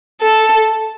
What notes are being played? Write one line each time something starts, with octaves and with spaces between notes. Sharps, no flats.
A4